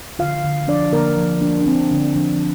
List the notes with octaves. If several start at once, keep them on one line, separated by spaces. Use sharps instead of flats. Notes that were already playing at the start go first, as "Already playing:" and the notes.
D3 F4 F5
D3
F3 D4 D5
D3 A#3 A#4
F3
A#3 D4
D4
F3 C4
D3 D4
F3 D4